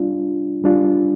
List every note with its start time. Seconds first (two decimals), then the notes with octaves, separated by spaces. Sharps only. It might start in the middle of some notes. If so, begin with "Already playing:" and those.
Already playing: G3 D4 F4
0.64 G3 D4 F4